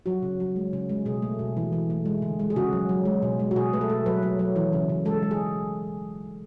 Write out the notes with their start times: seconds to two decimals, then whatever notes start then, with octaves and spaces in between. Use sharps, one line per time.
0.06 F#3 F#4
0.22 C#3
0.40 F#3
0.56 G#3
0.73 C#3
0.89 G#3
1.06 B2 G#4
1.22 A3
1.39 B2
1.57 E3
1.73 E3
1.90 A3
2.06 G#3
2.22 D3
2.39 G#3
2.50 G#4
2.56 C#3 F#4
2.73 F#3
2.89 F#3
3.05 G#3
3.22 B2
3.40 G#3
3.51 F#4
3.56 B2 G#4
3.73 A3 B4
3.81 A4
3.90 A3
4.06 F#3 B4
4.23 F#3
4.39 F#3
4.56 E3
4.73 C#3
4.89 C#3
5.05 G#3 A4
5.23 G#3
5.31 G#4